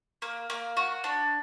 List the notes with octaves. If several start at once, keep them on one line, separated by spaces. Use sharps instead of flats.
A#3
A#3
F#4
D4